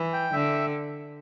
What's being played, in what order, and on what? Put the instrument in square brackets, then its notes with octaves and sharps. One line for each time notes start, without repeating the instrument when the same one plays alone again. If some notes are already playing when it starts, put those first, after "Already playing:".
Already playing: [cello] E3
[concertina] G5
[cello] D3 [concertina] E5